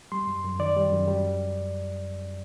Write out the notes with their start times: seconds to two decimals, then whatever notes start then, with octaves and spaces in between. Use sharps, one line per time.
0.12 G3 C6
0.27 F#2
0.44 F#2
0.59 D#3 D5
0.77 G3
0.92 F#2
1.08 G3